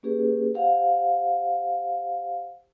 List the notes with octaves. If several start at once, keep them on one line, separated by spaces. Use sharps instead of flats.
A#3 C#4 G4 G#4 B4
G4 C5 F5 F#5